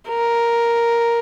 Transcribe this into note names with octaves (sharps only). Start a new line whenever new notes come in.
A#4